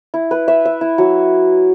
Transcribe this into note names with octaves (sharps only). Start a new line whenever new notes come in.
E4
B4
E5
E5
E4
F#3